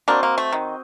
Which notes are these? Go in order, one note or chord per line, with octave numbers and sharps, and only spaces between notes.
A#3 C4 D4 F#4 C5 D#5
A#3
A3
D#3